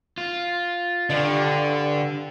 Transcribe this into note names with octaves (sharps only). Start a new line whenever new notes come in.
F4
G2 D3 D5